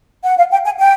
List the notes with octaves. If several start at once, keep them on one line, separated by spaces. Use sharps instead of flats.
F#5
F5
G5
G#5
G5